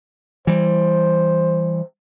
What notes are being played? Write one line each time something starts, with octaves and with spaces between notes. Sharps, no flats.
E3 G3 C5